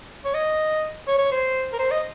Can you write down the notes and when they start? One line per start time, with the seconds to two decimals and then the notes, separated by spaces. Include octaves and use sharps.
0.25 C#5
0.34 D#5
1.08 C#5
1.18 C#5
1.32 C5
1.73 A#4
1.79 C5
1.91 D#5